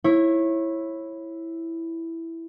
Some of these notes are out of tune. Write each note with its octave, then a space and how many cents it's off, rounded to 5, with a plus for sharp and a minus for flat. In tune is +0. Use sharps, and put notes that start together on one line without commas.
E4 +0 C#5 -25